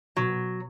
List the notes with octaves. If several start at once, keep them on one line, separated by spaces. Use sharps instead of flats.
B2 F#3